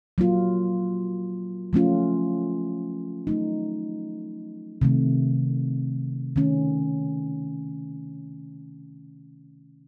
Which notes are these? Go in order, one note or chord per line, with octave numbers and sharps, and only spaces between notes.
F#3 A#3 F4
F3 A3 C#4 F4
F#3 A3 D#4
C3 D#3 A3
D#3 A3 C#4